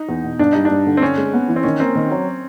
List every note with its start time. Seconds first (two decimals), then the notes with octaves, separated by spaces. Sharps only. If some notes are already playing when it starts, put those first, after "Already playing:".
Already playing: D#4
0.09 E2
0.24 B2
0.39 G2 D4
0.52 G3 D#4
0.65 D4
0.71 G2
0.87 D3
0.97 C4
1.02 G2 C#4
1.18 G#3
1.34 B3
1.48 E3
1.56 C4
1.64 D#3 C#4
1.80 A#3 C4
1.95 D#3
2.11 F#3